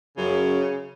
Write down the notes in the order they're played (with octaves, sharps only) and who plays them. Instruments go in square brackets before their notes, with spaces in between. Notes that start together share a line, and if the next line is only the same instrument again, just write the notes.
[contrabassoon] F#2 [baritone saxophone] C#3